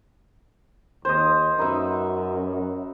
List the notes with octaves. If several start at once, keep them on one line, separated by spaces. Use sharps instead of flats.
D#2 C5 D#5
F#2 D#4 B4 E5